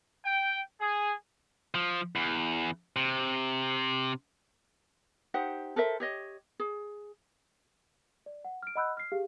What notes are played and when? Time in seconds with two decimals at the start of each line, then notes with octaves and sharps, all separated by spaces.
0.24 G5
0.80 G#4
1.74 F3
2.16 E2
2.96 C3
5.34 D#4 G4 C5 F#5
5.76 A4 A#4 C5 E5
6.00 G4 C#5 D#5
6.60 G#4
8.26 D5
8.45 F#5
8.63 F6 D7
8.76 D#5 F#5 B5 E6 F#6 G6
8.97 F6 C7
9.12 G4 G#4 F5